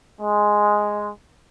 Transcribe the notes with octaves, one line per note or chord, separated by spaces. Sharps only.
G#3